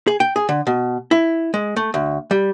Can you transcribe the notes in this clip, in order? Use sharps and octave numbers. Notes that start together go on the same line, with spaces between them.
G#4
G5
G#4
D3
B2
E4
G#3
A3
D2
G3